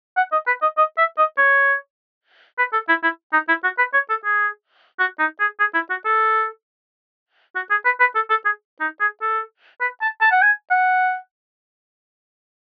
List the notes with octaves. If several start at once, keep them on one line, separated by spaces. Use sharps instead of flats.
F#5
D#5
B4
D#5
D#5
E5
D#5
C#5
B4
A4
E4
E4
D#4
E4
F#4
B4
C#5
A4
G#4
F#4
D#4
G#4
G#4
E4
F#4
A4
F#4
G#4
B4
B4
A4
A4
G#4
D#4
G#4
A4
B4
A5
A5
F#5
G#5
F#5